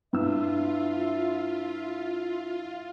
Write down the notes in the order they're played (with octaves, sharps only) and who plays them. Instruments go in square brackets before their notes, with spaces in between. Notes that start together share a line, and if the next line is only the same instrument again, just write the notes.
[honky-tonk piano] G2 E6 [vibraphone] E4 [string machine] F4 [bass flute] E5